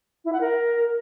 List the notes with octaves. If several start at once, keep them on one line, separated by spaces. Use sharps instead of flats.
E4
F#5
A#4